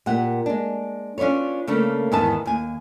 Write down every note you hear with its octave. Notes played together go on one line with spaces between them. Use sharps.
A#2 G4 F#5
G#3 D4
C#4 D4 F4 B4 C#5
C#3 A3 A#3 D4 B4
E2 G#2 D#3 B3 B4 A5
D#2 G#5